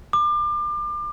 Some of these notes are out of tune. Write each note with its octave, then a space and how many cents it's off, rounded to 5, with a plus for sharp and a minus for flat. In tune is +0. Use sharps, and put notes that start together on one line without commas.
D6 +35